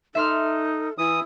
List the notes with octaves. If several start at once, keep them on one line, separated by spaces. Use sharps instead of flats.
D#4 A4 E5 C6 F6
E3 E4 D#6